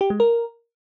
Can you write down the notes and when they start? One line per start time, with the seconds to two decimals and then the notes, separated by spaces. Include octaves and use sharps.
0.01 G4
0.10 G#3
0.20 A#4